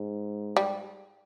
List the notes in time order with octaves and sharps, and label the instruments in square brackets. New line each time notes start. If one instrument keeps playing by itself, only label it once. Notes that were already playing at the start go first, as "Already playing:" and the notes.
Already playing: [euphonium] G#2
[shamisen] G3